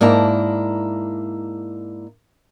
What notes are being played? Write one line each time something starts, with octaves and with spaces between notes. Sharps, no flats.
G#2 A#3 D4 E4 A#5